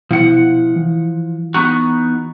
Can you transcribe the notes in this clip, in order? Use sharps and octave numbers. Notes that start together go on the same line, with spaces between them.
B2 F3 E4 F#5
E3
B3 D#4 F#4